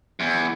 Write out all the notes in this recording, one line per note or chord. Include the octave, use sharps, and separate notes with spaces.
E2